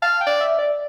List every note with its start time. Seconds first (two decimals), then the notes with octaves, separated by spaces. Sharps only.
0.02 F5 A5
0.21 G5
0.27 D5
0.40 E5
0.58 D5